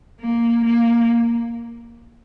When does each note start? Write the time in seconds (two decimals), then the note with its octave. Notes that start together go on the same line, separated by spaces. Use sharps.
0.20 A#3
0.65 A#3